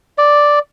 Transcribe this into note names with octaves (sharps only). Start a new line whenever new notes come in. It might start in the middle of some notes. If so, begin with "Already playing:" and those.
D5